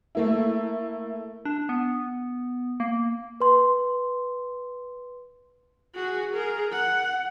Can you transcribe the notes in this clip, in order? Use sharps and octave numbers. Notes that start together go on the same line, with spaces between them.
A3 A#3 E4
D4
B3
A#3
B4 C6
F#4 G#4
G#4 A#4
F#5